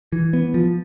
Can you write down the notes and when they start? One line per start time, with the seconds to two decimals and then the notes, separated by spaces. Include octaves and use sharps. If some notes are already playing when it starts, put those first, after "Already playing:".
0.12 E3
0.33 B3
0.54 F3